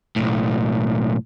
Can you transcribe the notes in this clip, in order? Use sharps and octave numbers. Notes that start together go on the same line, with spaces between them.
B1 A2